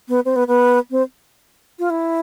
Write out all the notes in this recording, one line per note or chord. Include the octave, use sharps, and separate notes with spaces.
B3
C4
B3
B3
C4
F4
E4